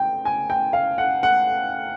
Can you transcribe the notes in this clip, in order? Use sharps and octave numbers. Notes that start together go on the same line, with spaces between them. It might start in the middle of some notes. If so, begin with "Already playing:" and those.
Already playing: G5
G#5
G5
F5
F#5
F#5